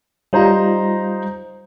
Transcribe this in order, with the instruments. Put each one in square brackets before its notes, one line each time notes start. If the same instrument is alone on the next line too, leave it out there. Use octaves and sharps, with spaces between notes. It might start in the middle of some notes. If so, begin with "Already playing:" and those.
[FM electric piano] G3 F4 [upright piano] D#4 C5 A#5